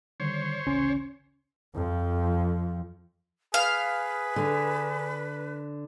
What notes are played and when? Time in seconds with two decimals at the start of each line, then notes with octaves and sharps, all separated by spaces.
0.20 D3 D#3 G3 C5 C#5
0.66 A1 D2 C#3 C#4 C6
1.75 F2 F3
3.54 G#4 B4 F5
4.36 D3